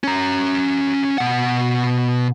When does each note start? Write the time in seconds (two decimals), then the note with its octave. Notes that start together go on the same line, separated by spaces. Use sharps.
0.04 C#4 A#5
1.18 B2 F#5